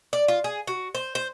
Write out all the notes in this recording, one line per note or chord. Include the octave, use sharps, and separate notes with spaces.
D5
F4
G#4
F#4
C5
C5